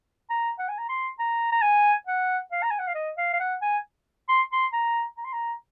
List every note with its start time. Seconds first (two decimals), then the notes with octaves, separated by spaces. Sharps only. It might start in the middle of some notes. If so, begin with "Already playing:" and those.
0.30 A#5
0.59 F#5
0.69 G#5
0.78 A#5
0.89 C6
1.19 A#5
1.52 A#5
1.62 G#5
2.07 F#5
2.52 F5
2.63 A#5
2.71 G#5
2.79 F#5
2.87 F5
2.95 D#5
3.18 F5
3.34 F5
3.40 F#5
3.62 G#5
4.29 C6
4.53 C6
4.73 A#5
5.18 A#5
5.25 C6
5.33 A#5